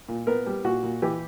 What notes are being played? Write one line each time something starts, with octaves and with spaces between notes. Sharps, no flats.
A#2
B3 A#4
G3
A#2 F#4
A#2
E3 G4